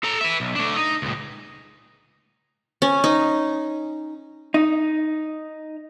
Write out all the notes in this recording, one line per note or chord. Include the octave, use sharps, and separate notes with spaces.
A4 A#5
B4 E5
B1
A3 D4
D#4
C#2 A#2
C#4
D#4
D#4